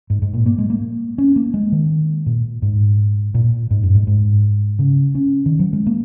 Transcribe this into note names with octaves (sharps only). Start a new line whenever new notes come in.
G#2
G#2
A#2
A#3
G#3
A#3
C#4
A#3
G#3
D#3
A#2
G#2
A#2
G#2
F#2
G#2
G#2
C#3
C#4
D#3
F#3
G#3
A#3